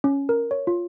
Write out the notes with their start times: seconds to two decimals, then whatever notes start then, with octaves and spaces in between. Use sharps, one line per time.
0.04 C#4
0.29 A#4
0.51 C#5
0.67 F4